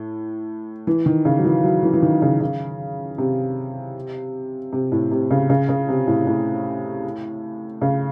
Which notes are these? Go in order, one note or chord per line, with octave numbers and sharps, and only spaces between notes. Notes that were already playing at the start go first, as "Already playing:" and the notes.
Already playing: A2
E3
D#3
C#3
F#3
E3
F#3
E3
E3
D#3
C#3
C#3
C3
C3
A2
C3
C#3
C#3
C#3
C3
A2
A2
C#3